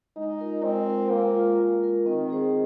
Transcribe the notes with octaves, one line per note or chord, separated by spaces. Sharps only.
G#3 D#4
F4 A#4
G#3 C4
F4 A#4
G#3 A#3
F4 A#4
G#3
F4 A#4
D#3 C4
G#4 C5